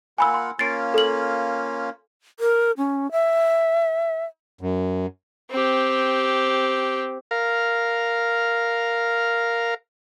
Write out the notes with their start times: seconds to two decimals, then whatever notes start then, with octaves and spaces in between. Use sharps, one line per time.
0.18 A#3 F4 F#5 G#5 B5 E6
0.34 C6
0.59 A#3 C#4 F4 A6 C7 D7
0.94 A4 F#7
2.40 A#4
2.77 C#4
3.12 E5
4.61 F#2
5.51 C4 G4
7.31 A#4 F5